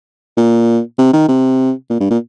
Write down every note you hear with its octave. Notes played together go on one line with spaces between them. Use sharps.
A#2
C3
D#3
C3
A#2
G2
A#2